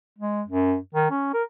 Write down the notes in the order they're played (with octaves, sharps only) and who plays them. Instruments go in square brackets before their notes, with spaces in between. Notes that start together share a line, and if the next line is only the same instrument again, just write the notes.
[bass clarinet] G#3
F#2
D#3
C#4
A#4